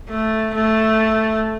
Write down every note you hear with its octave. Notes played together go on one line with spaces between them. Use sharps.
A3
A3